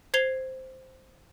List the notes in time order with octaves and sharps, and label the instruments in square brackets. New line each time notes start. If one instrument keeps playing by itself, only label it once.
[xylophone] C5 G#6 C7 F7 G7